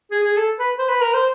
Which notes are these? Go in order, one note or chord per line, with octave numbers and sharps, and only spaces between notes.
G#4
G#4
A4
B4
C5
B4
A#4
C5